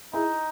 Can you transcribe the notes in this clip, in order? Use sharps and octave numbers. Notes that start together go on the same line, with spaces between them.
D#4 E4 G#4